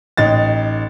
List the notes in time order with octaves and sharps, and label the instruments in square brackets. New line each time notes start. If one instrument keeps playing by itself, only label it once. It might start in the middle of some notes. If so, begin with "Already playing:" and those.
[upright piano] A1 D#4 A6